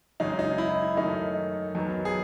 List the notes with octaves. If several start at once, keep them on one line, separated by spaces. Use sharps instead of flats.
F#2 C#3 G#3 D#4
D#4
E4
F#2 D#3 A3 D#4
F#2 D#3 F#3 B3
G#4